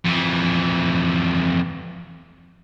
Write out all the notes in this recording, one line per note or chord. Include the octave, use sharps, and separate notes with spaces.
F2 E3